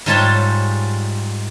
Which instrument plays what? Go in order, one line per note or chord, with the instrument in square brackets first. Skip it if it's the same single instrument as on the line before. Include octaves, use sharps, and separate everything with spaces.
[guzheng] G#2 G3 G#3 F4 C#5 A5